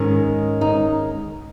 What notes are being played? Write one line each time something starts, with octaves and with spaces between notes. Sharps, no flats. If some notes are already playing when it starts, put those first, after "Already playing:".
Already playing: G#2 D#3 G#3 C#4
D#4